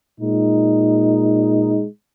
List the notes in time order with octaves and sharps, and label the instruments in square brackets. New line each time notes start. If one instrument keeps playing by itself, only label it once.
[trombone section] A#2 G#3 D#4